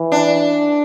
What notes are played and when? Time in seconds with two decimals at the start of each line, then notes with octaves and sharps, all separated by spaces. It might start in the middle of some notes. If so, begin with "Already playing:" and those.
Already playing: E3
0.12 D4